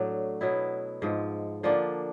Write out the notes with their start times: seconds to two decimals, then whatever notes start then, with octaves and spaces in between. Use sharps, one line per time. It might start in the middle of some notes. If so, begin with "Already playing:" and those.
Already playing: A2 F#3 A3 D4
0.41 B2 F#3 B3 E4
1.02 G#2 F3 G#3
1.63 D3 F3 A#3 D4